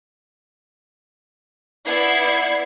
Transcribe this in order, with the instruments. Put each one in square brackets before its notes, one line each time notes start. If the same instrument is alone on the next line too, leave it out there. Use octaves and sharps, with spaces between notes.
[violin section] B3 E4 D5 G#6 C7 C#7